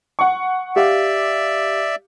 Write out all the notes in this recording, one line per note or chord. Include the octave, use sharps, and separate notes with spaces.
F#5 C#6
G4 D5 E5 F5